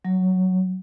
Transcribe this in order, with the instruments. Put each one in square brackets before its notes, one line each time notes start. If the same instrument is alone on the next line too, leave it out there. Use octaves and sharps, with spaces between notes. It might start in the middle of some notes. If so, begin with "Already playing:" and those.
[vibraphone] F#3